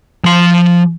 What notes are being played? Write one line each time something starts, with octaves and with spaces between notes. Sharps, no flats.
F3 C6